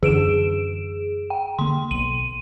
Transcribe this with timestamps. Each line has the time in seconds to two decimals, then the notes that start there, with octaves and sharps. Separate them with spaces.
0.03 F#2 D3 E3 G#4 D7 E7
1.30 G5
1.59 D3 A#3 C6
1.91 B1 D#7